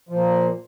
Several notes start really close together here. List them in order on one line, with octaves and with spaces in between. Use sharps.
F3 A#2 A#3